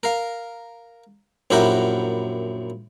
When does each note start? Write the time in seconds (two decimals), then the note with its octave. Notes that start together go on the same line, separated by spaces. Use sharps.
0.03 A#4 F5
1.51 A#1 F#2 E4 G4 A#4 F#5